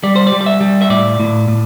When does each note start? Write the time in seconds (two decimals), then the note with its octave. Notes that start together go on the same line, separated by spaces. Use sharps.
0.03 G3 D5
0.16 C5
0.27 D5
0.32 G3
0.41 D5
0.46 E5
0.61 G3
0.82 E5
0.89 A2 D5
1.20 A2
1.48 A2